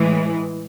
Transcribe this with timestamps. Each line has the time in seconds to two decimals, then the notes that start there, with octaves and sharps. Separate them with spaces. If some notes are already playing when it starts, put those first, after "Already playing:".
Already playing: A2 E3 G#3